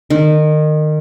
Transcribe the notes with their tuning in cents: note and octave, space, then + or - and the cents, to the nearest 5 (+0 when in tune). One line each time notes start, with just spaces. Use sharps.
D#3 -25